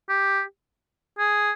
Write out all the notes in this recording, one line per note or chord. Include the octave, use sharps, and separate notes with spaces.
G4
G#4